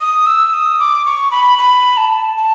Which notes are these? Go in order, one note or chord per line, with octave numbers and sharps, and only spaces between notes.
D#6
E6
D#6
D6
C#6
B5
B5
A5
A5